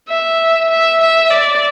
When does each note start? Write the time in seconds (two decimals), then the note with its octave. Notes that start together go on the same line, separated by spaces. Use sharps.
0.09 E5
0.69 E5
1.00 E5
1.30 D5